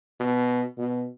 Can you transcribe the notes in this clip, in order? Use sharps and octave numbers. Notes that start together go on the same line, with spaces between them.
B2
B2